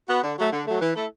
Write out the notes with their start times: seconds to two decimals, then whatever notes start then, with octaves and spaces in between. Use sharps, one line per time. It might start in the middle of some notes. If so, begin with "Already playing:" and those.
0.08 B3 F#4
0.23 D3
0.38 F#3 A3
0.52 D3
0.67 F#3 A3
0.81 E3
0.96 A3 E4 A4